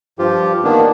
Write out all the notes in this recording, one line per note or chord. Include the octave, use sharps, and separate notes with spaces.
G2 F3 F4 G4
D#3 A#3 B3 D4